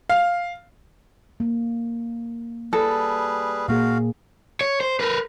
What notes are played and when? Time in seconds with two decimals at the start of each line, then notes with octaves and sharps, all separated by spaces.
0.09 F5
1.40 A#3
2.73 G3 G#4 A4 B4
3.68 A#2 A#3 F#4 G#4 F5
4.61 C#5
4.81 C5
5.00 A#4 B4